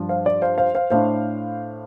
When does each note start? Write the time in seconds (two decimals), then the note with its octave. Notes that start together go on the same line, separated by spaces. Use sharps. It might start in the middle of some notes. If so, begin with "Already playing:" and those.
Already playing: G2 F3 D4
0.09 C5 F5
0.26 D5
0.42 C5 F5
0.58 C5 F5
0.75 C5 F5
0.90 A2 A3 D4 C5 F5